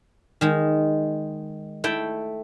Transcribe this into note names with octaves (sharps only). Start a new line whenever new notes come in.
D#3 G#3
A3 E4 G5